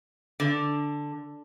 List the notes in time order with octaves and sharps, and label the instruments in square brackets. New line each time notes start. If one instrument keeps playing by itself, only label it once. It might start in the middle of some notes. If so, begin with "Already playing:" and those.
[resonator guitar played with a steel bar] D3